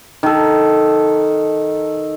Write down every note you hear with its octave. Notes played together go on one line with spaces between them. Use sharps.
D#3 A4